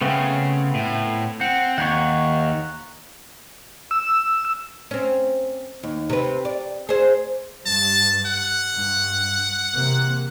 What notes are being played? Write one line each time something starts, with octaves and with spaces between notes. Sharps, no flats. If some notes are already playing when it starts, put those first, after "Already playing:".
C#3 A3 B3 C4
A2
C4 F#5
D#2 F#5 A#5 C#6
E6
C4 C#4
D#2
C3 B4
D5
G#4 C5
G2 A5
F#5
G2
E2 C3 A#3